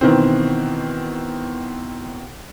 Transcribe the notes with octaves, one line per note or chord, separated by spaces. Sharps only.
B2 D#3 E3 C4